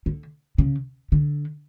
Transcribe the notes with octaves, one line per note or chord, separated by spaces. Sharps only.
D3
C#3
D3